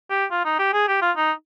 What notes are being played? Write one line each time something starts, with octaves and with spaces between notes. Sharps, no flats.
G4
F4
D#4
G4
G#4
G4
F4
D#4